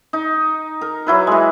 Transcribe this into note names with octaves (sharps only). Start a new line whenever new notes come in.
D#4
A#4
F#3 E4 B4
E3 G#3